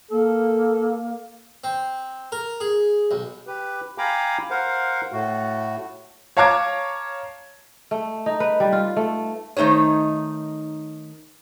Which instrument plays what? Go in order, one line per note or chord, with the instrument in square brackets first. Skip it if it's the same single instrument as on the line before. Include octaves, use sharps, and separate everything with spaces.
[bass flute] A#3 [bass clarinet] A4
[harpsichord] C4
A#4
G#4
B1
[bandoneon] G4 B4
F5 G5 G#5 A#5 B5 D6
A#4 C5 F5 F#5
A2 A3 F#4
[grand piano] C#5 F5 A5 A#5 D6 G#6
[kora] A3
D#4
B4
G3
F4
A3
[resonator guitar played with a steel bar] D#3 A3 D#4 C5 C#5